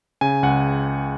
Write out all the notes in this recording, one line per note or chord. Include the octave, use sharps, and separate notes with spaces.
C#3 G#5
C#2 F#5